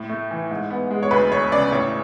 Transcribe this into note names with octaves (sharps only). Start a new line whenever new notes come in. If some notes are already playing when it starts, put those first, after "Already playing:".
Already playing: A2
A3
E3
G#2
B3
G#3
C#5
D2 B4
E1 C#5
C#3 D5
A2 C#5